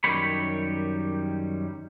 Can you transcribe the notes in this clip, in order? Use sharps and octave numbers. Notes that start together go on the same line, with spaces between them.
F#2 D#3 G3 G4 C#5 B5